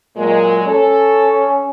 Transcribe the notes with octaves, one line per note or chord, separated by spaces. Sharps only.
A#2 F#3 G#3
C#4 A4